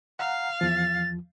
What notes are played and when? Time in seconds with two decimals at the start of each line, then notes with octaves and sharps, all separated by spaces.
0.19 F5 F#5 A#5
0.61 E2 F3 A6